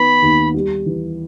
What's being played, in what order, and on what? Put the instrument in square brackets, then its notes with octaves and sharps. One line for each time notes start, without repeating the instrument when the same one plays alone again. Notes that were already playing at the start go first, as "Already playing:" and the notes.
Already playing: [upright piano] D#3 B3 [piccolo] B5
[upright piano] D#2
G3
E3